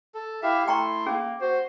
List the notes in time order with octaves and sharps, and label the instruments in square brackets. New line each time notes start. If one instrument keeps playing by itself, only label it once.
[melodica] A4
[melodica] E4 G4 F5 [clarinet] E5
[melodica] A3 E4 [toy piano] G5 A#5 C#6 [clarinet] C6
[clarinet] A#3 [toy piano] C#4 G#4
[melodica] F#4 [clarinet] C5